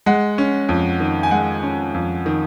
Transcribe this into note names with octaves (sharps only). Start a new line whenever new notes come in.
G#3 F#5
C#4
F2
D#3
G#5
G#3 F#5
C#4
F2
D#3